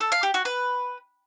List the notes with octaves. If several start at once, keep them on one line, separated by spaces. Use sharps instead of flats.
A4
F5
G4
F#4
B4